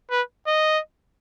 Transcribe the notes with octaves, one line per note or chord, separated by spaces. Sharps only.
B4
D#5